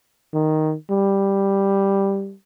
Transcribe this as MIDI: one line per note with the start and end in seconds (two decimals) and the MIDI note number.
0.34 0.74 51
0.90 2.34 55